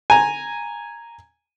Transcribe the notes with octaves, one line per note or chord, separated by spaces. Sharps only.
G#5 A#5